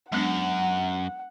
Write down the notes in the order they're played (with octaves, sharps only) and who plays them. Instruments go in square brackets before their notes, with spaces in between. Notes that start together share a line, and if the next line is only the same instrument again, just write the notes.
[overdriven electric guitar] F#2 [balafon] G#3 B3 D4 [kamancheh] F#5